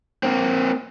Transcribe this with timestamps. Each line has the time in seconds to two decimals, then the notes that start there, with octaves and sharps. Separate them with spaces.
0.23 A#3 C4